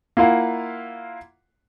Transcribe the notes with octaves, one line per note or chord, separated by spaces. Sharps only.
A#3 E4 F4 F5 F#5